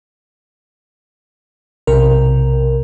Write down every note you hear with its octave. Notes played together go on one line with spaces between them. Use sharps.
B1 C3 C4 A#4